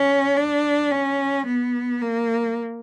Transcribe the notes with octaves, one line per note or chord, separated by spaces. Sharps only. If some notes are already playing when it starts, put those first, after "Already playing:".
Already playing: C#4
D4
C#4
B3
A#3